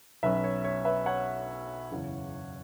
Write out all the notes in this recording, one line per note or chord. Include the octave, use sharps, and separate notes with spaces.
B1 B2 F#3 C#4 B4 E5
C#5
C#5
B4 E5
C#5 F#5
F#1 E2 C#3